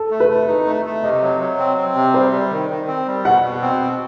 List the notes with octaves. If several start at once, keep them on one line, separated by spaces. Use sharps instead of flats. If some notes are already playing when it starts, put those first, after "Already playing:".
Already playing: A4
A3
B4
A3
D#4
A3
A3
C3 D#5
F#3
F#3
C4
C4
C3
G3 C5
G3
D#3
D#3
C4
G3
B2 F#5
B2
C4
B2